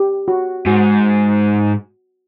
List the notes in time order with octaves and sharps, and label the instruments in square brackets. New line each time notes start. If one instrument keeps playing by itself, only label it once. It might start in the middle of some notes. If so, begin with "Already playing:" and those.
Already playing: [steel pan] G4
F#4
[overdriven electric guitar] G#2 [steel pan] F#4